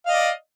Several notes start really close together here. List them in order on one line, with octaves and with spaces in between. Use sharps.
F5 D#5 D5